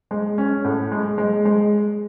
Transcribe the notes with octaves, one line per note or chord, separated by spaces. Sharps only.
G#3
C#4
A2
G#3
G#3
G#3